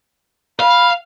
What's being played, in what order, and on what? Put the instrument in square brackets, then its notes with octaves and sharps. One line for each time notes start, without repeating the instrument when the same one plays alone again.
[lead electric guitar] F5 [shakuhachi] B5